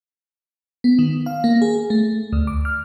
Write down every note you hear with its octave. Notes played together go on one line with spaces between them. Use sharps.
B3
D#3
F5
A#3
G#4
A3
D2
D6
F6